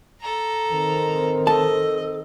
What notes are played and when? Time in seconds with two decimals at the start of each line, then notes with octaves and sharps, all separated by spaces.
0.21 A4 A#5
0.69 D#3 C4
1.47 A4 D#5 A5